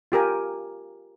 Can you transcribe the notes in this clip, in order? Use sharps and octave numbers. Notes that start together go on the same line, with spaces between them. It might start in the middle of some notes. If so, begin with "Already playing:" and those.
F4 G4 A#4 G#5